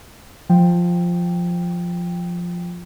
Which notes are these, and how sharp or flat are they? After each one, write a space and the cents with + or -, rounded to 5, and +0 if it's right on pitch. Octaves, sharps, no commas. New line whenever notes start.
F3 +0 G5 +0